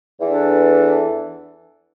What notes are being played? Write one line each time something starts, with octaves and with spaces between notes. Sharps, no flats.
E2 E3 D4 A4